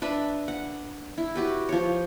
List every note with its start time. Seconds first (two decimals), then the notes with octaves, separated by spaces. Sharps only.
0.02 D4 B4 E5 B5
0.48 F#5
1.18 E4
1.36 F#4 G4 B4
1.69 F3 C#5